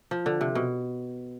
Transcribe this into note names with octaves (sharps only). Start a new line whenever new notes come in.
F3
D3
C3
B2